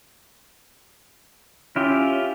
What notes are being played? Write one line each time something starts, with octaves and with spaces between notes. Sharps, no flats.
C#4 E4 F4 G4